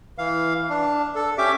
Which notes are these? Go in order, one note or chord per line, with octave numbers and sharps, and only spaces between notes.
E3 F5
D4
A4
C#4 G4 E5 D6